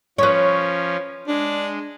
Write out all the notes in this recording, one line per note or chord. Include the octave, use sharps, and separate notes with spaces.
F3 C#4 B4 C#5
G#3 D4